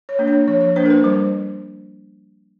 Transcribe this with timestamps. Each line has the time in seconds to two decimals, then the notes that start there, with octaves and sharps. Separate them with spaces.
0.09 C#5
0.19 A#3 D4
0.28 C#5
0.48 F3 C#5
0.61 C#5
0.76 A#3 D4 C5
0.86 A#4
0.90 B4
1.04 G3 C5